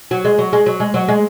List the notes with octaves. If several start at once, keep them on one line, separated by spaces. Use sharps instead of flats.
F#3
G#3
F#3
G#3
F#3
G#3
F#3
G#3